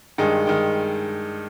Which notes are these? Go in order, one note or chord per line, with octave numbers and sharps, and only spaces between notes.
G2 D#3 G#3
D#3 G#3